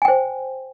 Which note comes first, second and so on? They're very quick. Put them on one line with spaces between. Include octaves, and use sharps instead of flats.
G#5 G5 C5